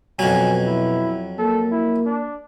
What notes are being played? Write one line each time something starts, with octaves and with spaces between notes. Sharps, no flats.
F2 B2 F#3 G#5
E4
A#3 A4
E4
D4